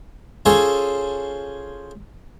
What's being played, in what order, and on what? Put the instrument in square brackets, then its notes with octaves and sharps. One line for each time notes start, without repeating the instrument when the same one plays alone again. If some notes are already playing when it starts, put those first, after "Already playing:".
[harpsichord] C#4 F4 G#4 A4 C5 C#5